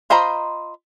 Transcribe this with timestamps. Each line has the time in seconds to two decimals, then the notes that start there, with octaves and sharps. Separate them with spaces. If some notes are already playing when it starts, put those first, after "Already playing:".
0.10 F4 C5 D#5 A#5 B5